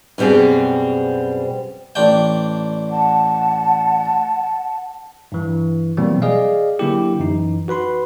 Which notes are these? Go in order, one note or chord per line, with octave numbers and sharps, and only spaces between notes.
F#2 B2 G3 C4 G#4
A1 D4 G5
F#5 A5
G2 E3
B2 E3 F#3 G3 A#3 C4
G#4 D5 D#5 F5
D3 F#3 A#3 E4 G4
F#2 E3 D#4
F#4 B4 B5 C6